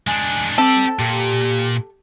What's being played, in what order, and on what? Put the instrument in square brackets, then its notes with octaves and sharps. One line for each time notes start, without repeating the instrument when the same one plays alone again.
[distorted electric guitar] G#3 D4 [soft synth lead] G#5
[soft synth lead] C4 [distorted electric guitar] G4 D5 [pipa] A4
[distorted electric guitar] A#2 [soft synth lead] G4